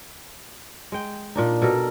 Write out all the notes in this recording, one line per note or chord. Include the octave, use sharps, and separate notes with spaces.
G#3 G5
A#2 D4 D#4
B2 A4 A#4